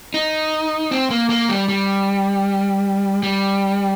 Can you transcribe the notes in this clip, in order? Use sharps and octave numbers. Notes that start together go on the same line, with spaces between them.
D#4
C4
A#3
A#3
G3
G3
G3